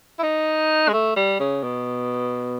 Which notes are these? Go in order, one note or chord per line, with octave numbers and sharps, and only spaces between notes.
E4
D#4
G#3
A3
G3
C#3
B2